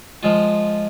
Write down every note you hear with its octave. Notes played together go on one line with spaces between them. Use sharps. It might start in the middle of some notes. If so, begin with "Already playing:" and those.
F3 G#3 F4